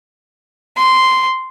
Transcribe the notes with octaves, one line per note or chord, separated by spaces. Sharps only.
C6